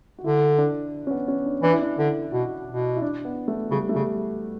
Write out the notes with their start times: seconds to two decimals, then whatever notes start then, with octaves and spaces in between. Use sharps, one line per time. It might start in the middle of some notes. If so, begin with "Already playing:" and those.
0.19 F#4
0.24 D3 E4
0.58 D4
1.07 C#4
1.11 B3
1.28 C#4
1.46 D4
1.62 E3 D4
1.73 E4
1.82 D4
1.98 D3 E4
2.32 B2 F#4
2.68 B2
2.97 E4
3.02 D4
3.25 B3
3.48 A3
3.71 C#3 G3
3.89 A3
3.95 C#3 G3